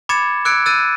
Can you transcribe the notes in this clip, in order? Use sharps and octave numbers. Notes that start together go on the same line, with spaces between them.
B5 D6 G#6 A6 C#7 E7
D6 E6 F#6 G#6 C#7 D7
E6 F#6 A6 D#7